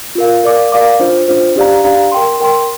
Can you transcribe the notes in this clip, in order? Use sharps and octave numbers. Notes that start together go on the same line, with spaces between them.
F4 A#4 F5
A#4 D5 F5 D6
A#4 D5 F5 D6
D4 F4 C5
D4 F4 C5
D4 G4 D5 F5 A#5
D4 G4 D5 F5 A#5
A#4 G5 C6
A#4 G5 C6